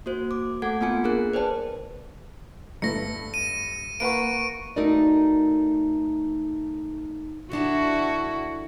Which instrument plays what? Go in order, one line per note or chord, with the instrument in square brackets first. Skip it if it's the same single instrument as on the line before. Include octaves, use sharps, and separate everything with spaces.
[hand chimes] A#3 F#4 C5
D6
A3 A4 F#5 G#6
A#3 B3 F4 G#5 C#7
D4 G#4 A#4 F#6
B4 C5 D5 G5 A5
[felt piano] G2 A3 B3 [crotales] A#6 C#7
[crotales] D#7
[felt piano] A#3 B4 F#5 [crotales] C#6 D7
[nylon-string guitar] A3 D#4 F#4 A#4 D5 D#5
[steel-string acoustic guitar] D3 D4 A5 [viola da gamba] E4 F#4